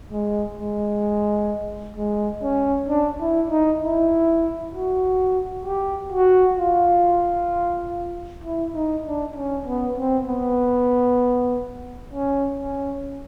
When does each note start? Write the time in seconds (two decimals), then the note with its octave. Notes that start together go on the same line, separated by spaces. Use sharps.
0.12 G#3
0.57 G#3
1.97 G#3
2.43 C#4
2.89 D4
3.20 E4
3.50 D#4
3.82 E4
4.74 F#4
5.65 G4
6.13 F#4
6.58 F4
8.44 E4
8.74 D#4
9.05 D4
9.36 C#4
9.67 B3
9.98 C4
10.28 B3
12.13 C#4
12.59 C#4